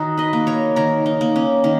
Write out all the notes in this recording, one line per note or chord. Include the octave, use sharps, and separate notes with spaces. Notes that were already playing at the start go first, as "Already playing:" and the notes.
Already playing: D#3 D#4 F#4
B4 D#5
A#3
A#4 C#5
D#3 A#4 C#5
D#4
A#3
C#4
D#3 C#4